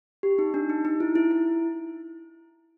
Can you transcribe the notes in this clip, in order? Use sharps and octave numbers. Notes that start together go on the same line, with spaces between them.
G4
D#4
D4
D#4
D#4
E4
E4
E4